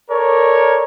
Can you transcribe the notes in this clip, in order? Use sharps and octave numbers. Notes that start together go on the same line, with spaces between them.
A4 A#4 C#5 D5